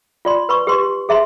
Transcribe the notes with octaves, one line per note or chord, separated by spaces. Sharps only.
F4 D5 C6
B4 B5 C#6
G4 B4 C6
G#4 E5 A#5 C6